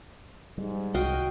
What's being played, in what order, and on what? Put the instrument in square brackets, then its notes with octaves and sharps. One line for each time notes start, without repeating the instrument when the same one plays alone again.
[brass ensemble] G#2 [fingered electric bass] G3
[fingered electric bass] C2 [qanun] F#4 D#5 F5 [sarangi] G5